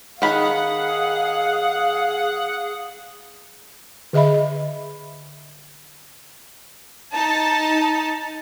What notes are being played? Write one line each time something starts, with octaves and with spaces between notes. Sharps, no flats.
D#3 G#4 F5 F#5 B5
D3 G#4 D#5 E5 B5
D#4 A5